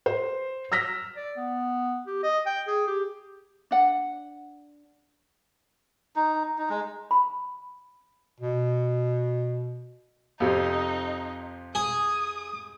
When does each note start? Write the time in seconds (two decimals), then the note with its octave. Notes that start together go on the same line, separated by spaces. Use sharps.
0.06 C5
0.72 E6 F6 A#6 B6
1.16 D5
1.37 B3
2.07 G4
2.23 D#5
2.46 G5
2.67 G#4
2.87 G4
3.71 D4 F#5
6.16 D#4
6.58 D#4
6.70 G#3
7.11 B5
8.40 B2
10.40 F2 C3 D#4
11.75 G#4 D#6